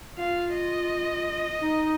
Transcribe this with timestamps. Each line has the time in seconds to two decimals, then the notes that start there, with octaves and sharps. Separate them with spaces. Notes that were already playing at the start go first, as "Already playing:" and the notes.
0.17 F4 F5
0.54 D#5
1.61 D#4